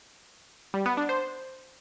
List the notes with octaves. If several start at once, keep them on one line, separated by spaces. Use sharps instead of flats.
G3
B3
D4
C5